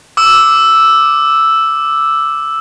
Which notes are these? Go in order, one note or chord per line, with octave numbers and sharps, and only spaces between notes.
D6 E6